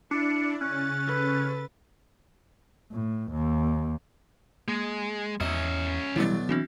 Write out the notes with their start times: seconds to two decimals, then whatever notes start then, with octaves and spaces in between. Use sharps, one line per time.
0.11 D4 E4 D5 C#7
0.61 C#3 C#4 F#6 A6
1.07 A4 B4
2.92 A2
3.31 D#2
4.68 G#3 A#3
5.41 E2 C#4 D#5 E5
6.16 B1 B2 E3 G3 B3 E4 D5
6.49 E3 C4 D4 F#4